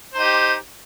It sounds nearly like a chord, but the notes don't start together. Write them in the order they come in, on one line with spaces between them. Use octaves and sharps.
C5 D#4 G4